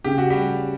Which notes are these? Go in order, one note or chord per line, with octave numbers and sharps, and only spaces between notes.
C#3 G4
F#4
G3 G4